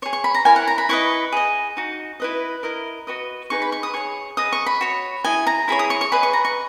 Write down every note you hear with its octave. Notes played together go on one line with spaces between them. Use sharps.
G#4 C#5 C#6
C#6
B5
A#5
E4 A#4 C#5 G#5
F#5
A#5
B5
E4 B4 D#5 C#6
G#4 D#5
D#4 F#4
E4 B4 D#5
E4 A#4 D#5
F#4 B4 D#5
D#4 G#4 B4 C#6
B5
C#6
D#6
G#4 C#5 C#6
G#4 B4 D#5 D#6
C#6
B5
F#4 C#5
E4 G#4 D#5 G#5
A#5
E4 G#4 C#5 B5
D#6
C#6
C#6
G#4 B4 D#5 B5
C#6
A#5
C#6